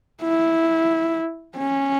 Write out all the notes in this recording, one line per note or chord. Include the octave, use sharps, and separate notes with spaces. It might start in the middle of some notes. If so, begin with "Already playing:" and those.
E4
C#4